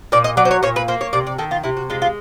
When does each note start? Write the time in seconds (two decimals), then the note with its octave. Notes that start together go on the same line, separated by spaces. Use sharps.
0.12 A#2 D5
0.24 D#5
0.37 F#3 D5
0.45 C5
0.51 C#5
0.63 A#2 C#5
0.76 B4
0.88 A#3 C5
1.01 C#5
1.13 C3 D5
1.27 D5
1.38 D#3 A4
1.51 F4
1.63 C3 E4
1.77 F#4
1.90 G#3 F4
2.02 F4